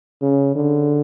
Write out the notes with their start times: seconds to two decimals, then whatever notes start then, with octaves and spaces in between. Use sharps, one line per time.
0.22 C#3
0.55 D3